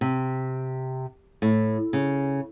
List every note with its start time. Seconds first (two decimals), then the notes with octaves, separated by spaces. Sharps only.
0.01 C3
1.42 A2
1.93 C#3